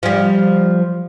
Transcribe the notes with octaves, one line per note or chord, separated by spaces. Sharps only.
F3 G3